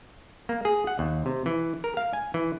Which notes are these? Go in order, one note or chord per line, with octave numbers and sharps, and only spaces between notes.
A#3
G#4
F#5
D#2
C3
E3
A#4
F5
G#5
E3